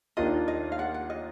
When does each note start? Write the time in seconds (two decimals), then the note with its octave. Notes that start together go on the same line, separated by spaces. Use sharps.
0.17 D#2 D#3 A#3 D4 F4 D#5
0.48 D#5
0.72 F5
0.79 F#5
0.94 F#5
1.10 D#5